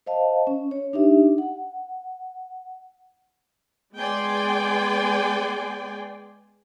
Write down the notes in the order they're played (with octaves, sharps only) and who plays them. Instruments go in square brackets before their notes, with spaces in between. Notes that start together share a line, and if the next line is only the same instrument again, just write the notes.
[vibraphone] C5 D#5 F5 A5
C#4
C#5
D4 D#4 G4 E5
F#5
[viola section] G#3 B3 D5 G5 G#5 C6